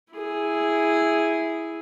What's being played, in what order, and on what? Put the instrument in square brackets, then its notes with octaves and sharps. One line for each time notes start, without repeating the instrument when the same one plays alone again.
[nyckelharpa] E4 G#4